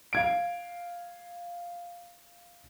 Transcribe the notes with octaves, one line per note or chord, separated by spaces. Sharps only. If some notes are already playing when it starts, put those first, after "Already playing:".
F5 G#6 D7